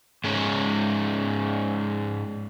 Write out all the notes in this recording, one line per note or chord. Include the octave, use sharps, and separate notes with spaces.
G#2 G#3 C#4